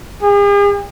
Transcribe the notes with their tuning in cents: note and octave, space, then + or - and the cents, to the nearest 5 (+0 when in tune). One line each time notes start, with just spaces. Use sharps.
G#4 -45